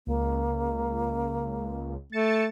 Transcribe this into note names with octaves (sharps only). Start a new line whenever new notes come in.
C#2 A#3
A3 A6 C#7 E7